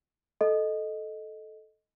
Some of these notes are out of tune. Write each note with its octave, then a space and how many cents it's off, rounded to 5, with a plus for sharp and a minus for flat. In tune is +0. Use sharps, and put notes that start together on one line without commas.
A4 -10 D#5 +0